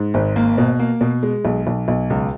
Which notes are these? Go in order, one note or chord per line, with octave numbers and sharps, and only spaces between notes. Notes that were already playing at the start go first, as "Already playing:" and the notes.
Already playing: G#2
G#1
A#3
B2
A#3
B2
G#3
B1
B1
B1
C#2